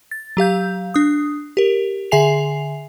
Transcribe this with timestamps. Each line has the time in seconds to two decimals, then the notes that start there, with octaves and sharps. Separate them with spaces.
0.11 A6
0.37 F#3 G4 F5 G6
0.94 D4 D#6
1.57 G4 A#4
2.11 D3 G#4 E5 G#5 C7 F7